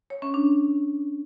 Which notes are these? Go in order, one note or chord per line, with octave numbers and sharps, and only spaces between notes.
C#5
C#4
D4